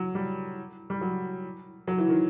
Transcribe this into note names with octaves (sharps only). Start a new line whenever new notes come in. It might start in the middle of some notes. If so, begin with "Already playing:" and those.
Already playing: F#3
G3
G3
F#3
F#3
E3
D#3